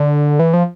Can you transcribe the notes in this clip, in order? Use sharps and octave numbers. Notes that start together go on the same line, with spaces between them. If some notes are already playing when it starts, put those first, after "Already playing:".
Already playing: D3
E3
F3